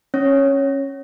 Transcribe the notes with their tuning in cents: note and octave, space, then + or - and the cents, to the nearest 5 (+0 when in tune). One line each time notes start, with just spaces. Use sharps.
C#4 -20 C#5 +0